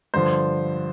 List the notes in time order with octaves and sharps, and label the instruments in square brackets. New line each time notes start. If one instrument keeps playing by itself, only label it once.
[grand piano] G2 D3 F3 C5